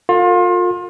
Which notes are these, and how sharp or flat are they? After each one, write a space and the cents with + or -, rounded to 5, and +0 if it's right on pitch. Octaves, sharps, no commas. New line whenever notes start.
F4 +30 A4 +45